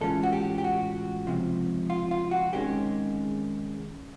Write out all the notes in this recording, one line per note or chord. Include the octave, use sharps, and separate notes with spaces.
A2 E3 G#3 C#4 F4 A4
F#4
G4
G4
F#4
C#2 C3 F3
F4
F4
F#4
C3 D#3 G#3 C#4 G4